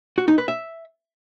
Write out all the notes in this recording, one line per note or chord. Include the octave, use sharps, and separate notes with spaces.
F#4
D#4
B4
E5